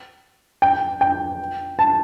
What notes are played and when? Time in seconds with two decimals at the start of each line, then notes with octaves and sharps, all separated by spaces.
0.62 G5
1.01 G5
1.79 A5